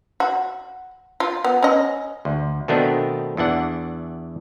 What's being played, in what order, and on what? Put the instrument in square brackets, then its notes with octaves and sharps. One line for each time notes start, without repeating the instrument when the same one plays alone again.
[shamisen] F#4
F4
B3
C#4 D#5
[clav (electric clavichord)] D2
B2 D#3 A3 B3 C4 D4
E2 E3 D4 F#5